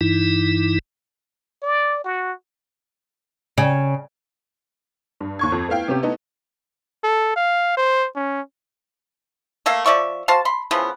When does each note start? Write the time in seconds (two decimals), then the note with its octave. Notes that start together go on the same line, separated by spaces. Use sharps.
0.01 G2 E3 D#4 E4
1.63 D5
2.04 F#4
3.58 C#3
5.21 G2
5.39 D#2 C#6 G#6
5.52 F2
5.68 A3 B3 E4 F5 G5
5.88 C3 B3 C#4 G4
6.03 A3 B3 D#4 E4 A4
7.04 A4
7.36 F5
7.77 C5
8.15 C#4
9.66 A3 A#3 E5 F5
9.86 F3 D5 E5 C#6
10.28 F#4 C5 F5 A5
10.45 B5 C6
10.71 C#3 E3 F3 B3